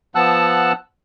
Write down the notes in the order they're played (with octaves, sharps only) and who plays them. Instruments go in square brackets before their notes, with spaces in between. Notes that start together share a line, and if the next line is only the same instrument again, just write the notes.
[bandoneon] F3 B3 F#5 A5 E6 F#6